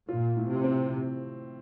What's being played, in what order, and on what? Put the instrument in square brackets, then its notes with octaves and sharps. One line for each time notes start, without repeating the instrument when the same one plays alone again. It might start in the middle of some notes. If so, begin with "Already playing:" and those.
[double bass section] A#2 [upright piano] F4
[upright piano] A2
[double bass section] C3
[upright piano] C4